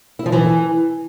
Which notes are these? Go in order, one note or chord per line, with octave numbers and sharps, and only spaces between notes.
E4
F3
E3